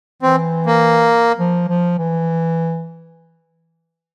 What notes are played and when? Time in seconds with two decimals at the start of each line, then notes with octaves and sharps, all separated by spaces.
0.23 E3 C4
0.66 A#3
1.39 F3
1.69 F3
1.99 E3